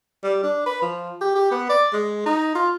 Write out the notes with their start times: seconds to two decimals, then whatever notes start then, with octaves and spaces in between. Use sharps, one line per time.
0.24 G3
0.43 D4
0.66 B4
0.82 F3
1.21 G4
1.35 G4
1.51 B3
1.69 D5
1.93 G#3
2.26 D#4
2.55 F4